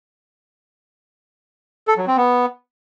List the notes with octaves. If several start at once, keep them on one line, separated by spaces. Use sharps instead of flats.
A4
F#3
C4
B3